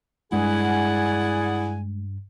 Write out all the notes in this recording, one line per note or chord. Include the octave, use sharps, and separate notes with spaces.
G2 G#3 E4 G#4 D5 F#5 G#5